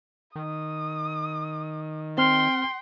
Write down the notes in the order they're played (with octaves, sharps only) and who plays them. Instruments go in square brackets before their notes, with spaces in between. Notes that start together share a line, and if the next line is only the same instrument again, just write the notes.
[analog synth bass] D#3 [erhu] D#6
[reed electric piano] C4 F6 [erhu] G5 [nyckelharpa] C6